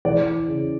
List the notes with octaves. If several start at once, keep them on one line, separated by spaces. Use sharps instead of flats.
E3 D5
C#3